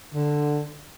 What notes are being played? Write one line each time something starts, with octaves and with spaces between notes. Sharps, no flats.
D3